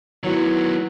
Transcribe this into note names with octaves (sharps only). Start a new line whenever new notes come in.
D#3 F#3 B3 E4